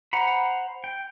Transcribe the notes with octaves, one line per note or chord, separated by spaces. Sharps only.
C5 F#5 A#5 B5
G5